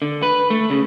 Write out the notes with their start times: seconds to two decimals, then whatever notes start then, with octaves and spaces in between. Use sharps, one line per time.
0.02 D3
0.23 B4
0.50 A3
0.70 C#3